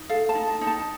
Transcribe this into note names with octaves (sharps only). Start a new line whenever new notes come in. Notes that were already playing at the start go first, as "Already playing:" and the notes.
Already playing: D#4
A4 F5
A5
D#4
A5
D#4
A5